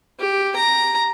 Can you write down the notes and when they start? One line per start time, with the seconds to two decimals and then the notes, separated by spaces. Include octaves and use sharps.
0.20 G4
0.56 A#5